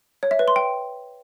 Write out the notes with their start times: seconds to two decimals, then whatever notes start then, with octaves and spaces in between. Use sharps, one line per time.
0.23 C#5
0.31 E5
0.39 B4
0.48 C6
0.56 G5